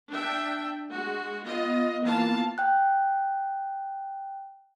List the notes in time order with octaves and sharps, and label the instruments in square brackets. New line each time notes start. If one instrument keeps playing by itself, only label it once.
[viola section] D4 E5 G5
G#3 F#4
B3 F4 D#5
E3 A#3 B3 F4 F5 A5
[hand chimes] G5 F#6